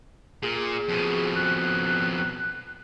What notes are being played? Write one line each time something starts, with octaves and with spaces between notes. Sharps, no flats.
A#2 G#4
F2 B2
F#6